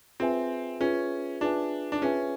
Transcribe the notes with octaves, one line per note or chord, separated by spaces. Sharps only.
C4 F4 G#4 B4 E5 G#5
C#4 F4 G#4 B4 E5 G#5
D4 F4 G#4 B4 E5 G#5
D4
C#4 F4 G#4 B4 E5 G#5